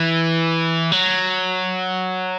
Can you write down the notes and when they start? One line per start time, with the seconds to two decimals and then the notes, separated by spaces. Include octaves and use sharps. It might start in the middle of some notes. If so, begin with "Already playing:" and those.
Already playing: E3
0.92 F#3